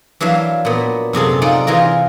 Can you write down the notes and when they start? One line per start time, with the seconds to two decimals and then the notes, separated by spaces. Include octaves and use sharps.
0.21 E3 F#3 D4 E5 F5
0.65 A#2 B3
1.13 F#2 C3 G#4 A4
1.42 D#4 F4 D5 F#5
1.67 E3 F4 G#4 A#4